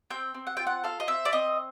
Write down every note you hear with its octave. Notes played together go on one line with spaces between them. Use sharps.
C4 G5
C4
F#5
F4 G5
F#5
A4 F5
D#5
C4 E5
D5
C4 D#5